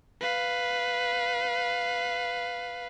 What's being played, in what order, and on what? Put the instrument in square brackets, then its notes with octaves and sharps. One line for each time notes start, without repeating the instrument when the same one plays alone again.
[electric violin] B4 F5